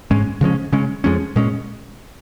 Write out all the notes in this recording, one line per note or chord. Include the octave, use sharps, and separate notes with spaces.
G#2 G#3 C#4
C#3 F3 G#3 C#4
C#3 G#3 C#4
F2 F3 G#3 C#4
A#2 G#3 C#4